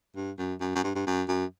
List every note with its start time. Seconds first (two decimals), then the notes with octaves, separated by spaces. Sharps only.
0.16 G2
0.38 F#2
0.61 F#2
0.75 F#2
0.84 G2
0.95 G2
1.07 F#2
1.29 F#2